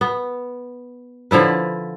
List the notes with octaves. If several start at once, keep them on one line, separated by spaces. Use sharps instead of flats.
B3
D3 F3 E4 B4